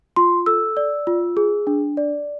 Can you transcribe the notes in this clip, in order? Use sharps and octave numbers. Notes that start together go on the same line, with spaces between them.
F4 C6
A4 E6
D5
F4
G#4
D4
D5